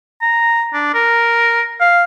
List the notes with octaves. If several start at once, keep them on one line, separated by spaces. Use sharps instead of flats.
A#5
D4
A#4
F5